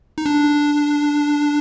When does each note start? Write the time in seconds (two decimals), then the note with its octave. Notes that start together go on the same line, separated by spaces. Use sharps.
0.18 D#4
0.26 D4